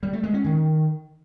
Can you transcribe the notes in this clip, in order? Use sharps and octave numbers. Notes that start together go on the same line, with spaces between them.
G3
A3
G#3
C#4
D#3